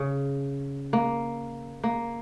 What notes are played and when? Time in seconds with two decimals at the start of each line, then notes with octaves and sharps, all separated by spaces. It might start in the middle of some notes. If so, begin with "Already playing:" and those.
Already playing: C#3
0.93 A#3
1.84 A#3